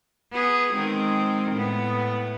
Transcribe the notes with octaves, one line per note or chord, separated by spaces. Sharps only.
B3 G#4
D#3 G#3 C4
A2 B3